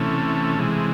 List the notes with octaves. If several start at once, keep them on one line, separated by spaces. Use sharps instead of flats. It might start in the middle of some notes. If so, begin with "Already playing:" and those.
Already playing: C3 E3 A3 C#4
C3 E3 G#3